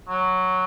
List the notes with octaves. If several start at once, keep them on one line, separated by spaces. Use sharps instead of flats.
F#3